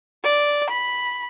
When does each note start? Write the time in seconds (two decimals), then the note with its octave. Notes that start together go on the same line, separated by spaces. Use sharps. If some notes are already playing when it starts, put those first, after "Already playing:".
0.24 D5
0.69 B5